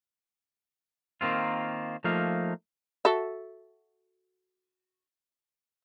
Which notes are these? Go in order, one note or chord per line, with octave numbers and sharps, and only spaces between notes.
D#3 A#3 C4 F4
F3 A3 A#3 D#4 F5
F#4 A4 E5